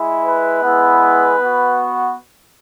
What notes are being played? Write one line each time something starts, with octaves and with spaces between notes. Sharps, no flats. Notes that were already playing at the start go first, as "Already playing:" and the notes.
Already playing: G#3 E4
B4
G#3 B3 E4
B3 F#4